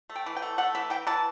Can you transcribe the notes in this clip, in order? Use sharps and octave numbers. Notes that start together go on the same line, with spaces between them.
A3
G5
E3
G5
A3
A3 F#5
E3 E5
E3 G5
E3 A5